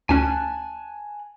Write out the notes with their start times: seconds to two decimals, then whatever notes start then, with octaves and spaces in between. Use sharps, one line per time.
0.09 D2 C#4 G#5 A5 F#6